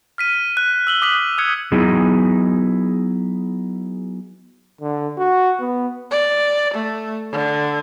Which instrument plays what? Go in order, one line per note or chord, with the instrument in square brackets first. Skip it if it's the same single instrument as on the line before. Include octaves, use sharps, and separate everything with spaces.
[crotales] F6 B6 D#7
F#6
E6 F#7 G7
D6 D#6 F#6 B6 F#7
D#6 F#6 G#6 C#7
[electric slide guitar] F#3 B3 D#4 E4 G#4
[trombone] D3
F#4
B3
[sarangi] D5
A3
D3